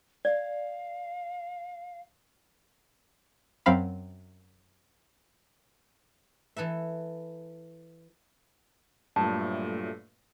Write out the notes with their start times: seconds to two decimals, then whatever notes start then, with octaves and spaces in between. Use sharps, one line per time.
0.25 D5 F5
3.66 F#2 F#3 C4 F5 B5
6.56 E3 A4 B4 E5
9.16 G2 A#2 F#3 A3 A5